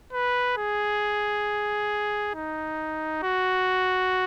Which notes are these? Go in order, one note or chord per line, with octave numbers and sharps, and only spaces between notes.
B4
G#4
D#4
F#4